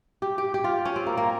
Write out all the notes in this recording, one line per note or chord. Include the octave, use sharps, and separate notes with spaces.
G4
G4
G4
F4
C#4
C4
A#3
A#3